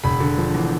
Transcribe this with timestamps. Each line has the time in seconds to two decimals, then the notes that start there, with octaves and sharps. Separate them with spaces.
0.04 E1 B5
0.20 D3
0.38 F3
0.54 E2